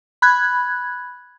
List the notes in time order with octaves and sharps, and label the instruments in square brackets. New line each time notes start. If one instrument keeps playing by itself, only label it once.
[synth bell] B5 F#6 G#6